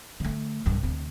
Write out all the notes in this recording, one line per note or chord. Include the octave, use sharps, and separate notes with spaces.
D3 A3
C2 G2
D2 C3